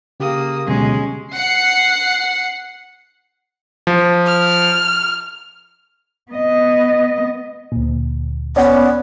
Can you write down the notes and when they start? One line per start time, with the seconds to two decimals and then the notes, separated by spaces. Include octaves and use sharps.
0.20 C#3 A#3 G4 D#6
0.67 D2 B2 F#3 G#3 C#4 G#4
1.35 F#5 C7 C#7
3.87 F3
4.27 F6
6.32 B3 D#5
7.72 D2 A#2
8.56 B3 C#4 D5 F#5